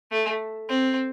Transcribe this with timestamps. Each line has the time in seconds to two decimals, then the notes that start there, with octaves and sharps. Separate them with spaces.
0.11 A3
0.69 C4